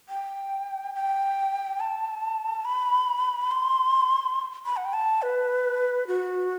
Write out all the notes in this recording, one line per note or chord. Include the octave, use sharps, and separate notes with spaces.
G5
G5
A5
B5
C6
B5
F#5
G5
A5
B4
F#4